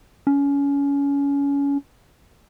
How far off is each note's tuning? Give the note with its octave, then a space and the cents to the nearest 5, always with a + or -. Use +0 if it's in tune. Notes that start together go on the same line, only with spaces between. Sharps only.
C#4 +25